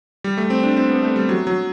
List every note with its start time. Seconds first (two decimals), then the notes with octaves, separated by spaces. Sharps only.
0.24 G3
0.38 A3
0.50 C4
0.63 D4
0.77 C4
0.90 B3
1.03 A3
1.16 G3
1.29 F#3
1.47 F#3